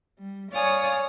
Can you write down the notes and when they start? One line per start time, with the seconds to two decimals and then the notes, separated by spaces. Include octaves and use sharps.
0.18 G3
0.51 C#5 D5 F5 G#5 D#6